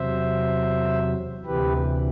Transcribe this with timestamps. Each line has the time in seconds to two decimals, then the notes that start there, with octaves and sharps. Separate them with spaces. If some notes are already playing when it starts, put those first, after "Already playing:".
Already playing: E2 C3 F#3 C5 E5
1.46 D2 C3 E3 G4 B4